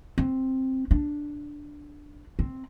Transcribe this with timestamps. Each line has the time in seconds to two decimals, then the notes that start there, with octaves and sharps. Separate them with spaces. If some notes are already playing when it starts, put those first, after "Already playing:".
0.18 C4
0.91 D4
2.39 C4